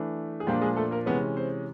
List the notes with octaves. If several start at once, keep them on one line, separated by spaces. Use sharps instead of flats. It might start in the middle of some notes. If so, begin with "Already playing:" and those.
Already playing: E3 A3 D4
G#4
A#2 F3 G3 A#3 D4 G4
G#3 G#4
A3 A4
A#3 A#4
C3 E3 G#3 B3 C#4 B4
C4 C5